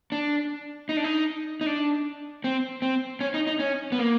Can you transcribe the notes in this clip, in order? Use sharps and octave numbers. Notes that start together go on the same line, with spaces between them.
D4
D#4
D4
D#4
D#4
D4
C4
C4
C#4
D#4
D#4
C#4
B3
A#3